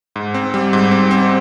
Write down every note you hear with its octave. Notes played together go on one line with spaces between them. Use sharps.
G#2
C4
G3
G#2
C4
C4